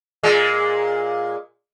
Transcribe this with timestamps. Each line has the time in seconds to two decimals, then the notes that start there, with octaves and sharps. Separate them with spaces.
0.23 A#2 G#3